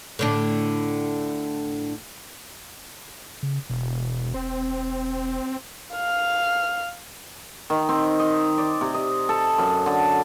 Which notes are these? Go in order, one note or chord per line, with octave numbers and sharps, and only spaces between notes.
A2 D3 D4
C#3
E1 B2
E1 C4
F5 F6
D#3
C4
D#5
D5
C3
D#5
A4
F#2
D3